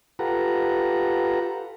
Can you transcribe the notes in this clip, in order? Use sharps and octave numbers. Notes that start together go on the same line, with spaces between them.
F4 G4 A4 B4 F#5 A#5